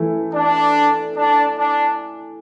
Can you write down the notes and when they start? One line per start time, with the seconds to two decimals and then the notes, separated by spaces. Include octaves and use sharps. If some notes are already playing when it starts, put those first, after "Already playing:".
Already playing: E3 A3 E4
0.33 D4
1.16 D4
1.57 D4